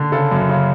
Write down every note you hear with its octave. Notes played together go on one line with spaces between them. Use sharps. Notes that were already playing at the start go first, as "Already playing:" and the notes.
Already playing: D3
C#3 A4
F#2
C#3